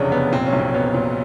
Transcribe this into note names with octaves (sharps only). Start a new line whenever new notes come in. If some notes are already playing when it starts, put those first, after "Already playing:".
Already playing: F1 E2 C#3 C#4 D4
F1 B3
A#2 C4
C#4
B1
C4
F#3 B3
A#2